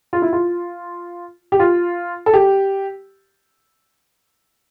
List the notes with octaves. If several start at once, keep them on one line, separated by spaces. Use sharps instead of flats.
F4
E4
F4
G4
F4
A4
G4